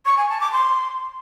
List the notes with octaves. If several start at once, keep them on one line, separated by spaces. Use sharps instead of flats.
C#6
G#5
A5
D6
C6